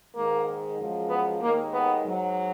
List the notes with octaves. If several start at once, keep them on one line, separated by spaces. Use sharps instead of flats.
G#2 D#3 G#3 A#3
F#2 F3 G#3
B3
D#2 D#3 G#3 A#3
B3
G#2 F#3